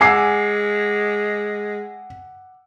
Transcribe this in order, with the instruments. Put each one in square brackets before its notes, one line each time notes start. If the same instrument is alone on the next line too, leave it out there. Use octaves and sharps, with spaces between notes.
[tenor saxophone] G#3 [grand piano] F#5 D6 E6 [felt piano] G#5 C7